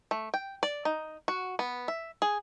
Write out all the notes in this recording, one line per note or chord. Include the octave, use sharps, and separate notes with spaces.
A3
G5
D5
D#4
F#4
B3
E5
G#4